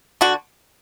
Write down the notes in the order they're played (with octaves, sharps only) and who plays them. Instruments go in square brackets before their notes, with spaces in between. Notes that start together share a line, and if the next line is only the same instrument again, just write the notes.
[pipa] D3 F#4